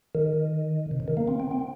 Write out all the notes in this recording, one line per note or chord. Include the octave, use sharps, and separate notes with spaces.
D#3
C3
C#3
D#3
A#3
C4
C4
C4